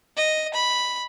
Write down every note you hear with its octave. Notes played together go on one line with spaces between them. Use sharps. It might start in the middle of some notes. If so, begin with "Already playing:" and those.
D#5
B5